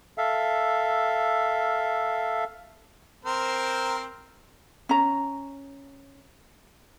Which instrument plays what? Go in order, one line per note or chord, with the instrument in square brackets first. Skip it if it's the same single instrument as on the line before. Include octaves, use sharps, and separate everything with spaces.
[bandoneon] A4 E5 F5
[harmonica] C4 A#4 C5
[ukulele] C#4 A#5